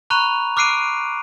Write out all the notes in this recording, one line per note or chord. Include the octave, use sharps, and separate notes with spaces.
A#5 B5 C#6 F#6 D#7 F7
D6 F6 F#6 C7 D7 D#7